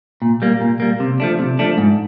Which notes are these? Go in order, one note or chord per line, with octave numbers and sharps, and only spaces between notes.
A#2
G3 A#3
A#2
G3 A#3
C3
F3 A3 D4
C3
F3 A3 D4
G#2